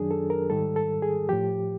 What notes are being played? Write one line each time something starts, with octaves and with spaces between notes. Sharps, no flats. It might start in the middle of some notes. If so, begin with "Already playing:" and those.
Already playing: F#2 D#3 F#3 D4 G#4
A4
A#4
G#2 D#3 G3 A4
A4
G#4
A2 F3 G4